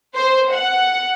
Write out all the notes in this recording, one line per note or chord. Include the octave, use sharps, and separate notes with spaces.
C5
F#5